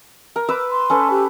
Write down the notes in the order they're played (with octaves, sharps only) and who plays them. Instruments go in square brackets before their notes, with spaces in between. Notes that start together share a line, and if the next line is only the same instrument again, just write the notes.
[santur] A#4
B4 D6 E6
[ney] C6
[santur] C#4 A4 B4
[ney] G4